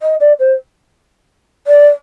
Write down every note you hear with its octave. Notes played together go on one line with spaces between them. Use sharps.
D#5
D5
C5
D5